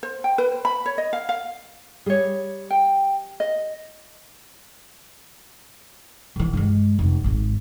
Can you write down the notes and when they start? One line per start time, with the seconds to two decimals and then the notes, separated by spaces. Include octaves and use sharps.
0.03 C5
0.24 G5
0.38 B4
0.52 C5
0.65 B5
0.86 C#5
0.98 D#5
1.13 F5
1.29 F5
2.06 G3 G#4 C#5
2.71 G5
3.40 D#5
6.36 A#1 E3
6.53 G2 G#3
6.99 F1
7.24 G#1 G#2